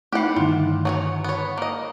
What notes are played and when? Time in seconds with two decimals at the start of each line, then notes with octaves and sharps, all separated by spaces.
0.13 A3 B3 D#4 E4 G4 F#5
0.36 G2 D3 D#3 F4
0.85 F#3 G#4 C#5
1.24 B3 C#5
1.58 A#3 D#5